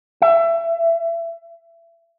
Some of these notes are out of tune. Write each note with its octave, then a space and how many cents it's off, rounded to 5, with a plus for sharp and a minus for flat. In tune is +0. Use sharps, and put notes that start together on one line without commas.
E5 +25